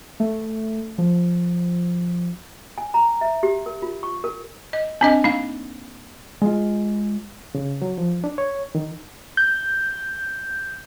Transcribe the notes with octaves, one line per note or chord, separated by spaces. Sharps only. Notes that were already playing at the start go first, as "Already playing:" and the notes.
A3
F3
G#5
A#5
E5
G4
A#4
F4
C#6
A#4
D#5
C4 D4 D#5 A5
A#3 D#4 F5
G#3 F4
C#3
F#3
F3
D4
C#5
D#3
G6